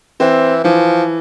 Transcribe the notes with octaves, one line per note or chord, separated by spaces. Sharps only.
E3 C4
E3 F3